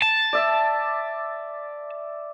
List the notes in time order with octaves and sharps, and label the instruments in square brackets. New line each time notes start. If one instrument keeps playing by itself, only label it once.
[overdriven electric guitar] A5
[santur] D5 E5